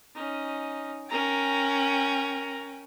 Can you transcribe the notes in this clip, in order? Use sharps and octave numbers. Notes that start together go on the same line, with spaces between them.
C#4 D#4
C#4 A#4 G5 A#5